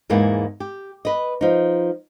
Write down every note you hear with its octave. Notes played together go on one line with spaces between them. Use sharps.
E2 G#2 A#3 B3 E4
G4
B4 D#5
F3 D#4